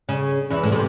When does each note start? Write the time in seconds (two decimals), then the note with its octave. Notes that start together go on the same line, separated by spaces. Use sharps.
0.09 C#3
0.50 E2 E3
0.63 A2
0.72 C3